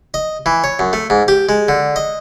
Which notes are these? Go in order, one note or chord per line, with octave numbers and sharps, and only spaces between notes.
D#5
E3
C#5
F#2
A3
G#2
G4
G#3
D3
D#5